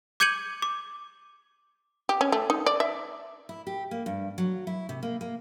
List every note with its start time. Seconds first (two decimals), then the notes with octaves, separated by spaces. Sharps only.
0.20 D6 G6 G#6 C#7 D#7 F#7
0.62 D6
2.09 G4
2.21 C#4
2.32 A3
2.50 D#4
2.66 D5
2.80 E5
3.49 E4
3.67 G4
3.91 A#3
4.06 G2
4.38 F#3
4.67 E4
4.89 C3
5.03 A#3
5.21 A#3